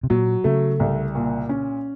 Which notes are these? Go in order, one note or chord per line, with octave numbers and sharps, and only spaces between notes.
C3
A#2 F#3
C#3 A3
C2
A#2
C#4